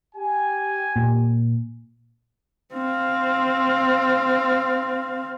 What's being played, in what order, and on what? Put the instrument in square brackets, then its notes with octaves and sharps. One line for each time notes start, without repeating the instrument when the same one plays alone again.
[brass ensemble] G4 G#5
[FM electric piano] A#2
[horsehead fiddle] C4 F5